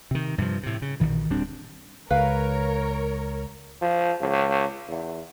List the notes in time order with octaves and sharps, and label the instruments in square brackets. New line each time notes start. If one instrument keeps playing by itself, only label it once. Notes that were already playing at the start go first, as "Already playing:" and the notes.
[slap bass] C3 D#3
G2 C3 E3 F3
A2 C3
C#3
A#1 B2 D#3 E3
D1 G3 C4 D4
[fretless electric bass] C#2 [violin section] A#4 C#5 [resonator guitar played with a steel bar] B4 F5
[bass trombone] F3
C#2
E2